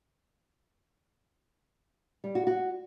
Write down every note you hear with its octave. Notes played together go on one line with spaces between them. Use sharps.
G3
F#4
F#4